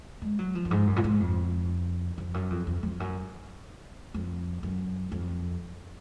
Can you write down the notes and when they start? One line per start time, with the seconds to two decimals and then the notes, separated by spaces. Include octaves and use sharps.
0.22 G#3
0.39 F#3
0.55 F3
0.65 F#2
0.71 G#2
0.87 F#2
0.96 A#2
1.04 G#2
1.20 F2
2.18 F2
2.34 F#2
2.50 F2
2.67 F2
2.83 F2
3.00 F#2
4.14 F2
4.63 F#2
5.12 F2